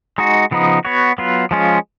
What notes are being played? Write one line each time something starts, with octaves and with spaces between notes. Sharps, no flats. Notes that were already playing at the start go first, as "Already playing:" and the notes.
G#3 D#4 F#4
C#3 F3 B3 D#4
B3 F#4 C#5
F#3 B3 F4
F3 G#3 C#4 F4